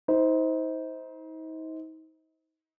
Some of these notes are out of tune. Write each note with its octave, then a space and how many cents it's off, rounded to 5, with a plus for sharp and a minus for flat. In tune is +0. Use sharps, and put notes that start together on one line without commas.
D#4 +40 C5 -10